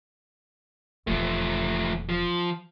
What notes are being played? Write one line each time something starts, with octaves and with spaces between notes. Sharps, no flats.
D#1 E2 F3 A3
F3